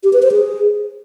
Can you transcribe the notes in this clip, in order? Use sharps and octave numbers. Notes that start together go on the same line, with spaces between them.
G4
B4
C5
G#4